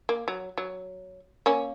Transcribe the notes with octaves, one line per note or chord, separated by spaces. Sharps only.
A#3
F#3
F#3
A#3 C#4